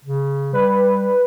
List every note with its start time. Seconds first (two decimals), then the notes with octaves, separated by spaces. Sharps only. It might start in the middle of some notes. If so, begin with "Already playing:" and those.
0.05 C#3
0.53 G3 B4